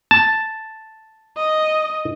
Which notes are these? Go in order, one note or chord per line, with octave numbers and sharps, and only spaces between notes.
A5
D#5